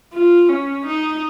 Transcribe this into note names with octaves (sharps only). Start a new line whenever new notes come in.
F4
C#4
D#4